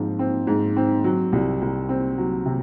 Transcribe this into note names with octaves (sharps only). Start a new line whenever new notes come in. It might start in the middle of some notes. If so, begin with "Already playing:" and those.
Already playing: G#2 F3 C4
C4
G#2
C4
F#3
C2
C2
C4
F#3
C3